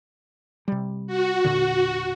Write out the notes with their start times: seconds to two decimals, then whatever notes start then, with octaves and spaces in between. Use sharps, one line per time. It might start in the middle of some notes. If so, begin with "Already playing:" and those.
0.68 C3 G3
1.07 F#4
1.44 E1 A#2 D3